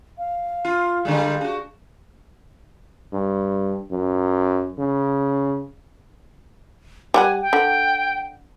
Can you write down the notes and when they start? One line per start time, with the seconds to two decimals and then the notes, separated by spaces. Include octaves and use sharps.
0.18 F5
0.65 F4
1.05 D3 G3 G#3
1.41 D4 F#4
3.13 G2
3.91 F#2
4.79 C#3
7.14 G3 G4 F#5 G#5
7.42 G5
7.53 D3